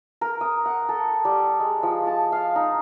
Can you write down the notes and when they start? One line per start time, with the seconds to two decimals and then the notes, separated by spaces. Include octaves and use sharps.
0.21 A#4
0.41 D#6
0.65 F#5
0.89 A4
1.25 G3
1.60 G#3
1.83 F3
2.07 A5
2.32 F5
2.56 D#4